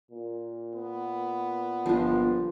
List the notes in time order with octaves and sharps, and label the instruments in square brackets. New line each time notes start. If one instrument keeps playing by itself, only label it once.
[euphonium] A#2
[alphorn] B3
[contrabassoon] G1 [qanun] F3 D4